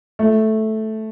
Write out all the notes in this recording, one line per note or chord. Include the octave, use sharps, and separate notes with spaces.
A3